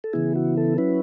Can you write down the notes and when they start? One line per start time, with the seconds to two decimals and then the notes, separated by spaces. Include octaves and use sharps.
0.04 A4
0.13 C#3 E3 B3 E4 G#4
0.36 F#4
0.57 A4
0.78 F#3 C#4 E4 B4